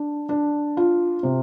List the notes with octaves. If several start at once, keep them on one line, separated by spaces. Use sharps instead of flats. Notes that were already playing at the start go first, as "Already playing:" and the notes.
Already playing: D4
D4
F4
C3